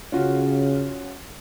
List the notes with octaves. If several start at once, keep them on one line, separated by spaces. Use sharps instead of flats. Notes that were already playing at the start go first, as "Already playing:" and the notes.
C#3 C#4 F4 F#4